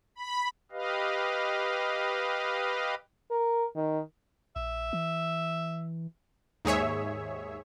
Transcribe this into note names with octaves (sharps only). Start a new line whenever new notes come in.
B5
G4 B4 D#5 F5
A#4
D#3
A#1 E5
E3
D#2 G#2 G#4 C#5 E5